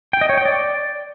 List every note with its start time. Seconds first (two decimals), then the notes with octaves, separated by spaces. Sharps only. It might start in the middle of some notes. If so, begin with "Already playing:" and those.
0.13 G5
0.21 D#5
0.29 C#5
0.37 G5
0.45 D5